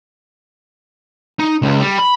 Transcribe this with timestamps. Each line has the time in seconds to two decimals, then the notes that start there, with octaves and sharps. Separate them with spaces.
1.39 D#4
1.62 C#2
1.81 G3
1.99 B5